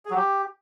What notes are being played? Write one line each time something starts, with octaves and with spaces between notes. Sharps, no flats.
G#4
F#3
G4